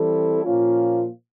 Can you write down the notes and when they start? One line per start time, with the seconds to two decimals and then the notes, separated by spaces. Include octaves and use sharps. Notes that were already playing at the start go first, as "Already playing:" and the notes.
Already playing: E3 G3 C4 E4 A4
0.43 A#2 F3 A#3 C#4 F4